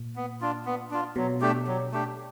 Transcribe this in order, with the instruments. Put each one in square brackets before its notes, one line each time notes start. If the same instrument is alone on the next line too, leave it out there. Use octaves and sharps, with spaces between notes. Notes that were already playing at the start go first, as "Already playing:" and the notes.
Already playing: [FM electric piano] A#2
[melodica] B3
D4 F4
B3
D4 F4
[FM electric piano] B2 [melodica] F#3
[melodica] A3 D4 G4
F#3
A3 D4 G4